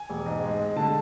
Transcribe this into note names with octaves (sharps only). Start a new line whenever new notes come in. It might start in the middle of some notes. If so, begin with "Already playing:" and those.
Already playing: G#5
E1
G#2
G#3
G#3
D3 A5